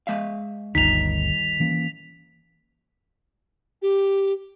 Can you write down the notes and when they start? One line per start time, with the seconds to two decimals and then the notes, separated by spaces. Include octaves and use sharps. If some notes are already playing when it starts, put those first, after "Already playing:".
0.07 G#3 E5 F5
0.75 G1 D2 D#3 G3 D#4 B6 F7
1.60 E3 A#3 C#4
3.82 G4